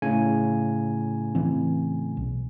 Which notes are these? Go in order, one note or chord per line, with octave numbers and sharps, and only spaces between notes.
A2 C#3 G#5
E3 C4
B1